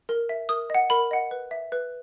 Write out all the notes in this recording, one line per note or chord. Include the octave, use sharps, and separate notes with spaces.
A#4
E5
A#4 D#6
D#5 F#5
A#4 B5
D#5 F#5
B4
E5
B4